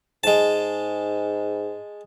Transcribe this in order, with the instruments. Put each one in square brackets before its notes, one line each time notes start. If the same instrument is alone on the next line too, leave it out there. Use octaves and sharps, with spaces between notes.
[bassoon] G#2 [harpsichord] G#3 A5